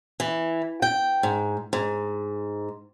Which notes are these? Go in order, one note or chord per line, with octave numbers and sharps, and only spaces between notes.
E3
G5
G#2
G#2